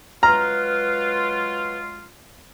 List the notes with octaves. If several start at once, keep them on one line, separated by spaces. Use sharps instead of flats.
F#3 G#3 F4 B4 A#5 F6